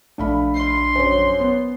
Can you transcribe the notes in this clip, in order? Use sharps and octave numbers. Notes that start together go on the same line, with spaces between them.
A#1 A3 D4 F5 B5
C6
F#2 C5 C#5
B3